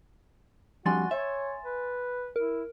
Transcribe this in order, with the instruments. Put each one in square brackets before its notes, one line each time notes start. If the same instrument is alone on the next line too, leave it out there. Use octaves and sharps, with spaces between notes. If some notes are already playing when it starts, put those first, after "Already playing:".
[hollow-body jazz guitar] F2 G3 D4 [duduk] F#4 [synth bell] G#5 C6 A6
[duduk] C#5 [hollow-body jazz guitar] E5
[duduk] B4
[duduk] E4 [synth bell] A#4